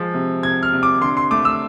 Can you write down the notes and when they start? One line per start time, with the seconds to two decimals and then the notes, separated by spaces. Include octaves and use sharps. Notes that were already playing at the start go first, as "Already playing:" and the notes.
Already playing: F3 G#3
0.14 C3
0.43 C3 G#6
0.63 F6
0.73 C3
0.83 D6
1.01 D3 C6
1.17 C6
1.31 A3 D6
1.45 E6